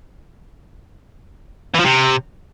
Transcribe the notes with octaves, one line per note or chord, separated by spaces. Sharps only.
E3
F3
C3